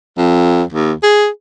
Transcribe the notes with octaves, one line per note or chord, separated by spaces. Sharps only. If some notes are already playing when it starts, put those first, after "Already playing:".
F2
D#2
G#4